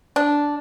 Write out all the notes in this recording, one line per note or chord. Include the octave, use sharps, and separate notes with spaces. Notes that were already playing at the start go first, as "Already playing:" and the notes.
D4